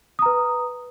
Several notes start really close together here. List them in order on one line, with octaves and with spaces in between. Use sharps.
D#6 A#5 B4